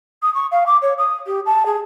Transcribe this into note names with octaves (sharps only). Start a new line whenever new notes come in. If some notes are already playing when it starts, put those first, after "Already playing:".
D#6
C#6
F5
D6
C#5
D#6
G4
A5
G#4